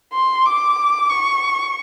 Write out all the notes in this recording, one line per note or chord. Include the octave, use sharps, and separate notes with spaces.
C6
D6
C#6